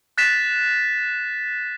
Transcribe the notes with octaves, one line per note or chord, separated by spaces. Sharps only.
F#6 A6 B6 E7